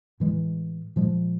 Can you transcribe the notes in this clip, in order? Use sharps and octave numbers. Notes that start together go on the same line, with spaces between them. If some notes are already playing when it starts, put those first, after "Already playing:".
A2 E3 G#3
A#2 F3 G#3